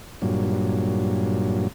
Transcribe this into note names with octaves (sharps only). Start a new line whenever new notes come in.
G2 A#2 F#3